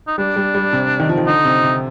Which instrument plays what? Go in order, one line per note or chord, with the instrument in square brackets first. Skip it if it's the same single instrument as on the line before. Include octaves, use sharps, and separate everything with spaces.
[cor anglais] D#4
[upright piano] G3 [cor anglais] D4
[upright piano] G3
G3
C3
D#3
F3
D#3
[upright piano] D3 [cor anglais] D#4
[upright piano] C3
C3